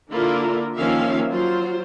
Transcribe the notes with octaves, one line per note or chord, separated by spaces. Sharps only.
D3 A#3 D4 E4 F4 A#4
D#3 F3 A#3 C#4 E5 F5
F#3 F4 C5